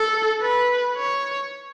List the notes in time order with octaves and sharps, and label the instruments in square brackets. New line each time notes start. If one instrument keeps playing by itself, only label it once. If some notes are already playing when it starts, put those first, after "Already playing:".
Already playing: [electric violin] A4
B4
C#5